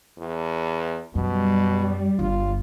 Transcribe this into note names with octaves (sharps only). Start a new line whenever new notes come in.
E2
F#2 B2 G3
G1 F4